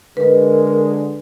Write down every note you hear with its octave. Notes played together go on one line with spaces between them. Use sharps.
D3 G#3 A#4 B4